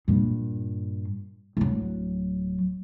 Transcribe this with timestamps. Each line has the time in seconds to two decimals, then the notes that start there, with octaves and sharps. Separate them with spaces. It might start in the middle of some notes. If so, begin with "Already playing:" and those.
0.08 G2 A#2
1.57 D1 F#3